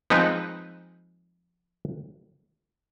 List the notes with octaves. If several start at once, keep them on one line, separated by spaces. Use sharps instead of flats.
F3 G#3 C4 D#4 B4